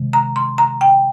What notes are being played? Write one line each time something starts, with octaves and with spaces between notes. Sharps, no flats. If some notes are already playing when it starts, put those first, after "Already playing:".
Already playing: C3 D#3 G#3
A#5
C6
A#5
G5